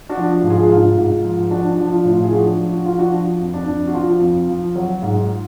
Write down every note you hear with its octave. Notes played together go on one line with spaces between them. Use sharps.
D4 F#4
F3
G#2
F4 G#4
D4
G#2 F4
G#2
F3
F3 D4 F#4
D4
F3
F4
A2
F4
G#4
F3 D4 F#4
F3
F#4
F3 F4
D4 F#4
F3
F2
D4
F2
F#4
F3 F4
F2
F3
F#3
G#2